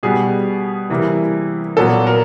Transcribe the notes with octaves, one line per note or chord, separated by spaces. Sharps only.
B2 G3 B3 G#4
C3 E3 G3 A#3
A#2 F#3 B3 A4
A#4